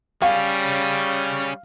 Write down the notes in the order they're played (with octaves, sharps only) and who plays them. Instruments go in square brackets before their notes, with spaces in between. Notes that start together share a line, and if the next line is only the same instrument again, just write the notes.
[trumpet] G3 [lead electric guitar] C#4 G#4 [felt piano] F5